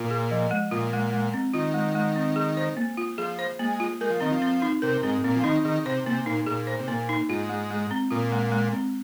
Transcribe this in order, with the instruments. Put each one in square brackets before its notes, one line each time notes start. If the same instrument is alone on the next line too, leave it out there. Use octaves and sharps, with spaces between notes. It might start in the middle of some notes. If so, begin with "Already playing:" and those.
Already playing: [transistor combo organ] A#2 [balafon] F4
[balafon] G#4
F3
G#3
[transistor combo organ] A#2 [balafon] F4
[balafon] G#3
G#3
C4
[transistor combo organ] D#3 [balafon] F4
[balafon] G#3
G#3
C4
G#4
C5
A#3
F4
[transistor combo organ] F3 [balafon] G#4
[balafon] C5
[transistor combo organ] G#3 [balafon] A#3
[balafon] F4
[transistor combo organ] G#3 [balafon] A#4
[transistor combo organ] F3
[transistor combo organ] D#3 [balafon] C4
[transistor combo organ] F3
[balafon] C4
D#4
[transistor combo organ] C3 [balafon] A#4
[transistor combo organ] G#2 [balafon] C4
[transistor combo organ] A#2 [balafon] C4
[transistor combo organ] F3
[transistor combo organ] D#3 [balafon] D#4
[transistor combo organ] D#3 [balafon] G#4
[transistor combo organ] C3 [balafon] C5
[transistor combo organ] C3 [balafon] A#3
[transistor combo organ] A#2 [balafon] D#4
[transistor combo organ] A#2 [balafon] G#4
[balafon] C5
[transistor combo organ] C3
[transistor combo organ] A#2 [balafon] A#3
[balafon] D#4
[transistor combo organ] G#2 [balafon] F4
[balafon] G#3
G#3
C4
[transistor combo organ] A#2 [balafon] F4
[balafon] G#3
G#3
C4